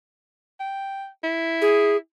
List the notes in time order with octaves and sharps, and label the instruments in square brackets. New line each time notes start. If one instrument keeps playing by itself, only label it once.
[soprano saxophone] G5
E4
[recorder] G#4